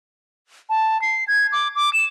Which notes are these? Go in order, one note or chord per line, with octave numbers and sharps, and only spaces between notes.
A5
C7
G#6
D6
D6
E7